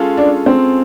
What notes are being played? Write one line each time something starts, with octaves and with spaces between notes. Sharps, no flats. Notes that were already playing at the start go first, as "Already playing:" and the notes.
Already playing: G#3 C#4 F4 A4
D4
C4